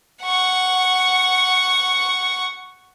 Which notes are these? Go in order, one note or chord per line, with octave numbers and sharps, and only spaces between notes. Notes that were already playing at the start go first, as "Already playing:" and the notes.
F#5 C#6